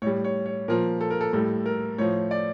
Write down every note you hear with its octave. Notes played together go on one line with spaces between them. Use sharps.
A2 G3 C#5
C#5
C#5
A#2 F3 A#4
A4
A#4
A4
A2 G3 A4
A#4
A2 F3 C#5
D5